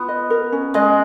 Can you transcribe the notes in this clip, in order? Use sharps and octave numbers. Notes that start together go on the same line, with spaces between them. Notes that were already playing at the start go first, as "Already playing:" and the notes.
Already playing: B3 F4
D#5
A#4
C#4
G#3 D#5